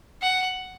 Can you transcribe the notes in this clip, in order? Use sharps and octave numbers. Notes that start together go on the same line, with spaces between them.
F#5